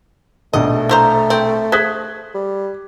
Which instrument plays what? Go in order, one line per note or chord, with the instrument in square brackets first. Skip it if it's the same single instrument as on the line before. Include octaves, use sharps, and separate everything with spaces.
[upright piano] A#1 B2 [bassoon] A3 [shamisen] D#5
[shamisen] E3 C5 A#5
C4
[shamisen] G#4 C5 [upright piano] F#6 G#6 B6
[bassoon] G3